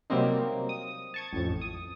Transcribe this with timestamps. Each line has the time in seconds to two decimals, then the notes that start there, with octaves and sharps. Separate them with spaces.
0.10 C3 F#3 G3 A#3 C4 D#4
0.69 D#6
1.14 A5 C#6 G#6
1.33 A1 F2
1.61 D#6